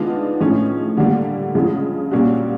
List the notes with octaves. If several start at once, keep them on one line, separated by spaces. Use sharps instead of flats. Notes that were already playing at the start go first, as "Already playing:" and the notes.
Already playing: D#3 G#3 B3 D4 F4
A2 F3 G#3 C#4
D3 G3 A#3
C#3 F3 G#3
A#2 G3 A#3 C#4 F#4